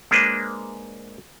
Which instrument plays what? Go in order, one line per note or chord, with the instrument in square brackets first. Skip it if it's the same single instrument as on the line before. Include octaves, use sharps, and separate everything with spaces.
[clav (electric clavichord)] G#3 A#3 D4 B4 C5